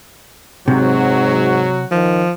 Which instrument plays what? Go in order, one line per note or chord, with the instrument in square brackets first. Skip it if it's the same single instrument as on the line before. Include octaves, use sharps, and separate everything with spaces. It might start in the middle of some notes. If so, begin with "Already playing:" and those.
[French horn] G#2 [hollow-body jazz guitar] C3 [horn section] F#3 F#4
[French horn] D#3 [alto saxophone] F3